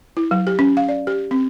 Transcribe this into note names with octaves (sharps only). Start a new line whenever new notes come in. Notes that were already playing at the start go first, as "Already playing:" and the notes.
E4
F#3
G4
C#4
F5
D5
G4
C4